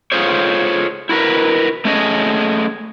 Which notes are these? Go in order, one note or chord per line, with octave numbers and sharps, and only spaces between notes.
F4 G#4 A4 C5 C#5
E4 F#4 A#4 B4
A3 C#4 G#4 D#5